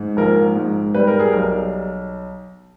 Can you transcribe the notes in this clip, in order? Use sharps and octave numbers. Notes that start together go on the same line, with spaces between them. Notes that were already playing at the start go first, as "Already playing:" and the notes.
Already playing: G#2
A#1 A#4
G#2
G3 B4
A#4
G#4
B1 A#4